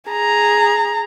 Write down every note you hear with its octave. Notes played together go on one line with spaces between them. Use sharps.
G#4 A#5